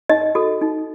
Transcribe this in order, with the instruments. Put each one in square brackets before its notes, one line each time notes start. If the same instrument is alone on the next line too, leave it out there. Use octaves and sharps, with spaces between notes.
[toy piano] D#4 D#5
F#4 A4
D#4